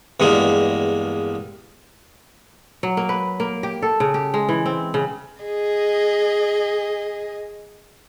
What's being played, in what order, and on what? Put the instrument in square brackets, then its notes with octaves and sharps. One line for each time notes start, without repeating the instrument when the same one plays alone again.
[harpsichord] E2 G2 G#3 A#3
[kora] F#3
A#3
B4
A#3
G4
A4
C#3
G4
G#3
E3
C4
C#3
[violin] G#4 D#5